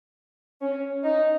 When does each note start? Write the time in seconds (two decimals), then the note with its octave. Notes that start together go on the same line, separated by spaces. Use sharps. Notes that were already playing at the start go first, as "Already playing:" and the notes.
0.61 C#4
1.04 D#4